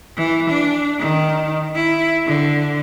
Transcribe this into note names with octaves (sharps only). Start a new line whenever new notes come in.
E3
D4
D#3
E4
D3